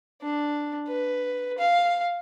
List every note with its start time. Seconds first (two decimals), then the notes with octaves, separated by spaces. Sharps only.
0.22 D4
0.88 B4
1.58 F5